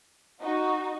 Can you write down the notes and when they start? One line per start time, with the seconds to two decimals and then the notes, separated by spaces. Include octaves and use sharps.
0.42 D#4 F#4